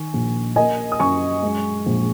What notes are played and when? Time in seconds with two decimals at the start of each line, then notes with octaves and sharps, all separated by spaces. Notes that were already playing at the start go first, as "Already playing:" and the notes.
Already playing: D#3 G#5 C#6
0.14 A#1
0.56 A#3 D#5 G#5
0.92 D#6
0.99 F#2 G#5 C#6
1.43 G#3
1.86 A#1